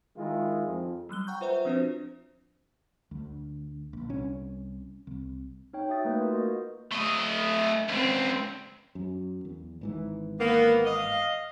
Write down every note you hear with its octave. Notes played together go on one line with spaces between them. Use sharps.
D#3 G#3 E4 F4
F2
F#3 G3 F#6 G7
F#5 G5 A#5 C#6 G6
F4 B4 C5 E5 A#5
F3 C4 D4 F4 F#4 C5
D2
A#1
C2 C#4
C2
D#4 C#5 G5
D#4 F#4 E5 D#6 A6
A3 A#3 B4 G6
F4 F#4 A#4
A#3 F#4 D#5
A3 D#5
C#2 C4
F#2
E2
G#1 G#2 E3
A#3 B3
D#5 F5